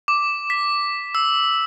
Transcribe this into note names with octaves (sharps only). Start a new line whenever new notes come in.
D6
B6
E6